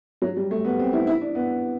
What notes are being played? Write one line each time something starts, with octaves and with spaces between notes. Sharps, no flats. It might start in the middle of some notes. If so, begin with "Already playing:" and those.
F#3
G3
A3
B3
C4
E4
E4
D4
B3